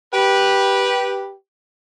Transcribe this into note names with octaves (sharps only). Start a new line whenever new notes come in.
G4 B4